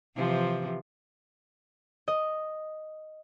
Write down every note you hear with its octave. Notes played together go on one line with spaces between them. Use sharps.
C3 E3 F3
D#5